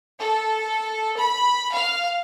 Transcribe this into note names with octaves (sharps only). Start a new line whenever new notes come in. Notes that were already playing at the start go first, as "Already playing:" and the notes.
A4
B5
F5